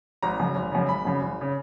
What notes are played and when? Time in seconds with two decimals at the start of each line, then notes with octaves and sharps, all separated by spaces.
0.23 G#1 A#5
0.39 F#2 C#3
0.56 G#1
0.72 F#2 C#3
0.89 G#1 B5
1.05 F#2 C#3
1.22 G#1
1.41 C#3